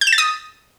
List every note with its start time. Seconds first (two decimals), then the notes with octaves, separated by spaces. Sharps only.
0.01 G6
0.07 E7
0.12 A6
0.18 D#6